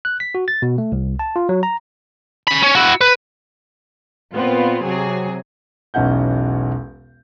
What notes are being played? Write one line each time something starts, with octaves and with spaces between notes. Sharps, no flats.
F#6
B6
F#4
A6
B2
A3
C2
A5
F4
F#3
A#5
C#4 B5
C#4
E4 F#4
B4
A#2 B3 C4 F4
C3 F#3 G#4
E1 B1 C#4 D#4 F#5 G6